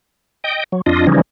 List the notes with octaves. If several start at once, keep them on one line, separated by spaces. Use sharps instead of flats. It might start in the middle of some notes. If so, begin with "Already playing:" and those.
D#5 G5
F#3
F2 D4 F4 D#5
C#3 E3 F3 G3 C#4 D#4